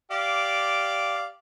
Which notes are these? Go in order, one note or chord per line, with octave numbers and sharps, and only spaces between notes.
G4 D5 F5